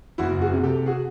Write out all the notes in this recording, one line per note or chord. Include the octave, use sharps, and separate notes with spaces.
F#1 E4 F#4
F#4 G#4
C3
G4 A4
F#4 G#4